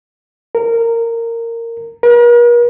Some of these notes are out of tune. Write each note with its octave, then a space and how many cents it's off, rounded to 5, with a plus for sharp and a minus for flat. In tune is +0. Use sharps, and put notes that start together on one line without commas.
A#4 -15
A#4 +45